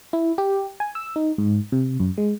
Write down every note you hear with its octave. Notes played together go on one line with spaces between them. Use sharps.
E4
G4
G#5
E6
D#4
G#2
C3
F#2
G#3